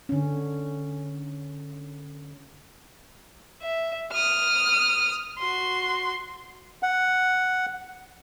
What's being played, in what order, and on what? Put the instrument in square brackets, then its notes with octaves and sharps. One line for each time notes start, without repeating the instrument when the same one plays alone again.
[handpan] D3 C#4
[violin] E5
D#6 F6
F#4 C6
[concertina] F#5